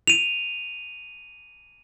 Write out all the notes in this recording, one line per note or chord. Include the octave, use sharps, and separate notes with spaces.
D#7 F7